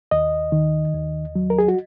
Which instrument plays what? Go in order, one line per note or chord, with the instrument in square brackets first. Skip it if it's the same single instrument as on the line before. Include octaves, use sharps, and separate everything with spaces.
[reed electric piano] D#2 D#5
D#3
D#2
F#3
A#4
G#4
F#4